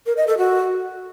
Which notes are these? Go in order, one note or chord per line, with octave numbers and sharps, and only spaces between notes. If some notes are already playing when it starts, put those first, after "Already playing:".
A#4
D#5
A4
F#4